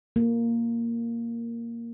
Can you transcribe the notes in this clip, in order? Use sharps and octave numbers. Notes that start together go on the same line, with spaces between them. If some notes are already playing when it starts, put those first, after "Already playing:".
A#3